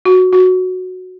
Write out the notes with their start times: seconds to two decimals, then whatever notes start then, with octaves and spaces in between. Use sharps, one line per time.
0.05 F#4
0.33 F#4